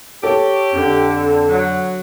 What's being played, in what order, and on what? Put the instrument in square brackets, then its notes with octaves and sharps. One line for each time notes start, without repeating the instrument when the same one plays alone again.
[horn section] G4 [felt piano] A4 [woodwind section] C#5
[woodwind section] F2 [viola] D3
[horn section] F#3